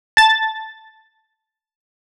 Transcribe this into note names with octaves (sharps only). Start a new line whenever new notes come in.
A5 A6